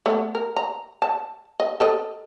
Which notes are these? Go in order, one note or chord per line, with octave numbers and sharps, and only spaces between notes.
A3 B3
A#4
A#5
A5
D#5
A4 A#4 D#5